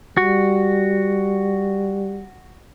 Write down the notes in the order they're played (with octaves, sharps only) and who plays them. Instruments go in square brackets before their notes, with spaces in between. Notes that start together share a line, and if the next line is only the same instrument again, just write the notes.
[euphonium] G3 [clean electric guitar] F#4